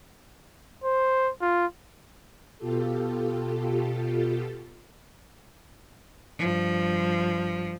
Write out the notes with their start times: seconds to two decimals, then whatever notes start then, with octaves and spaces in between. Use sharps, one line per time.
0.84 C5
1.42 F4
2.58 B2 F4 G4 A4
6.39 G2 F3